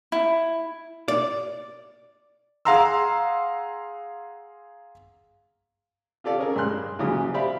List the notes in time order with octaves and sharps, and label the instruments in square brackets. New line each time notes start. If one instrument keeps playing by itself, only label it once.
[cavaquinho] E4
[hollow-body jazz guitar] D5
[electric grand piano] G#4 F5 F#5 A#5 C6 E6
[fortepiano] F4 G4 A4 D5 F5
C#4 G#4 A#4
G2 G#3 C6 F#6
A#1 C#3 E3 F#3 G4 D#6
G4 C5 D5 E5 F5 B5